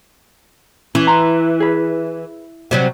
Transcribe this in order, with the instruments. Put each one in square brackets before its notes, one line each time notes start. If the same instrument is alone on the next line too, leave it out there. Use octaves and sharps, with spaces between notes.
[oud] E3 [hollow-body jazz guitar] C#4
[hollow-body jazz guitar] A#5 C6
G#4 B4
[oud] C3 F#3 G3